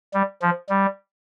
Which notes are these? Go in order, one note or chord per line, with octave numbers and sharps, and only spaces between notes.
G3
F3
G3